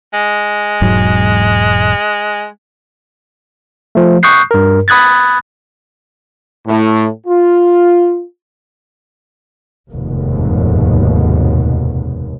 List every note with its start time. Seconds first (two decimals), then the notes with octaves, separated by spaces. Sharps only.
0.14 G#3
0.82 E1 G#2 F#3
3.95 F3 A3
4.23 C#6 D#6 F#6 G6 C7
4.51 G2 A#4
4.88 B5 D#6 F#6 G#6 A6
6.67 A2
7.27 F4
9.90 F1 D#2 G#2 B2